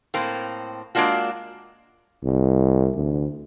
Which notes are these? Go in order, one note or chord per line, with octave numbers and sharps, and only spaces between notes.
A2 A#3 C4
G#3 A#3 D4 F4 F#4
C2
D2